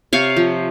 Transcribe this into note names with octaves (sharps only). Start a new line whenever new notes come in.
C3 C#5 F5
F3